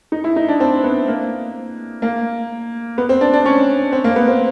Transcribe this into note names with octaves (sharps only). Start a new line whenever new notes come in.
D#4
E4
D#4
D4
C4
B3
A#3
A#3
B3
C4
D4
D4
C#4
C4
A#3
B3
C4